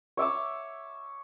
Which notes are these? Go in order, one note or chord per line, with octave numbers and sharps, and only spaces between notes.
C#5 E5 D6 E6